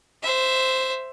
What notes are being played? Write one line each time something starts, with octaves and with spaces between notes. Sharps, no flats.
C5 E5